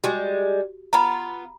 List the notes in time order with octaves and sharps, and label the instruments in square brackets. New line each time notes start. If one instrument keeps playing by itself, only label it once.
[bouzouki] G3 G#3 [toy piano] F#4 G4
[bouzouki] B3 F4 [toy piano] A#5 B5